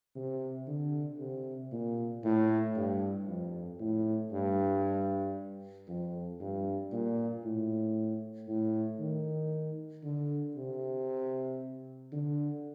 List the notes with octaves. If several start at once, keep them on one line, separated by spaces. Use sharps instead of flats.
C3
D3
C3
A#2
A2
G2
F2
A2
G2
F2
G2
A#2
A2
A2
D#3
D3
C3
D3